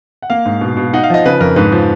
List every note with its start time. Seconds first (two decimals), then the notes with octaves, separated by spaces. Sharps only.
0.22 F#5
0.30 A#3 F5
0.46 G#2
0.61 B2
0.77 B2
0.94 D#4 F#5
1.04 F5
1.10 F3 D#5
1.25 C#3 B4
1.40 F2 A#4
1.56 G#2 B4
1.72 F3